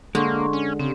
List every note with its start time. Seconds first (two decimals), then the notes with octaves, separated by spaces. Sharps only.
0.15 D3 G#3 A#3 C6 C#6
0.53 C#4
0.79 C#3 C4 G4